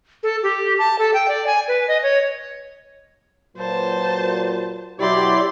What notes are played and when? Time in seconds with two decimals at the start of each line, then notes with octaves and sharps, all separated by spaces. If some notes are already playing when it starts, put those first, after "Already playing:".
0.23 A4
0.43 G4
0.79 A5
0.99 A4
1.14 G5
1.28 D5
1.47 G#5
1.68 B4
1.88 D#5
2.03 C#5
3.57 A#2 F#3 B4 C5 A5
5.00 B2 F#3 E4 G4 D5 C6